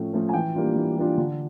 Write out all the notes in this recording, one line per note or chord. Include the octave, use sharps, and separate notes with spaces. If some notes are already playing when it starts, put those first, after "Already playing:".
Already playing: A2 F3 A3 C#4
F3 A3 C#4
G#5
E3 G5
G3 A#3 D4 F4
E3
G3 A#3 D4 F4
D3